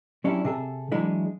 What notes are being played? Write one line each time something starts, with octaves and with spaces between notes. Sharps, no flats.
F#3 C#4 D4 E4 G4
C3 G#4 A4
E3 F#3 G#3 D4 E4